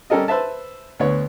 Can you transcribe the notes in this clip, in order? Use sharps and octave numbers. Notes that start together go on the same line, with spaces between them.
G3 C#4 G4 A4 A#4 D#5
B4 C5 E5 A5
D2 B3 C#5